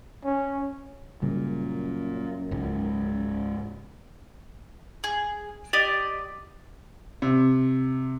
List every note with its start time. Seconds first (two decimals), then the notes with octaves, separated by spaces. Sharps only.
0.25 C#4
1.22 F#2 A#2 C#3 G3
2.51 C#2 G#2
5.04 G#4
5.73 G4 D5 D#5
7.22 C3